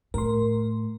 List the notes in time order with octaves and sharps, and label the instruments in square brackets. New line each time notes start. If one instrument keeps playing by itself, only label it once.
[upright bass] A2 [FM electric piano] A#4 C6